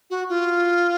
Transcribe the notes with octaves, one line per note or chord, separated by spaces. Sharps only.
F#4
F4